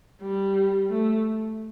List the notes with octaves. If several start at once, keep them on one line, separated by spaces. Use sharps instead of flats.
G3
A3